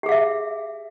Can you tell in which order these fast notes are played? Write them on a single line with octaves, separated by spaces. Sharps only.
G4 G#4 F5 E5